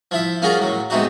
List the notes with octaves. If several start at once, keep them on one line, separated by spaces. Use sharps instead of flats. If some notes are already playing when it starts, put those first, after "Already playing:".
F3 E4 E5
A#3 C#4 F4 F#4 G#4 A#4
A2 F#3
G#2 B2 A3 C4 D#4 F#4